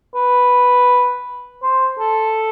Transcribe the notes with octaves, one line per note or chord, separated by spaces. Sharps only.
B4
C5
A4